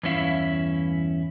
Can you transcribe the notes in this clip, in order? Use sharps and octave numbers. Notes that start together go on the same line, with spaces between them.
E2 G2 C#4 E4 F5